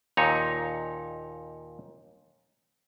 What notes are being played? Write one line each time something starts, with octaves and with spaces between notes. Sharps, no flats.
D#2 A#2 D#4 C#5